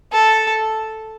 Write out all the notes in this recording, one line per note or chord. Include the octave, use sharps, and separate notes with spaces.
A4